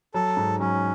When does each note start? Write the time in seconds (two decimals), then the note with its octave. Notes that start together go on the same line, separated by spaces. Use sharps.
0.14 F#3 A4
0.37 G#2
0.59 F#3 C#4